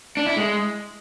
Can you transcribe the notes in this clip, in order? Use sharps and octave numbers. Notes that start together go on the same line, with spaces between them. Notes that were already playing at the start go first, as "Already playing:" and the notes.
D4
E4
G#3